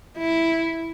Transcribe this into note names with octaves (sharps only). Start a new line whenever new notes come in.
E4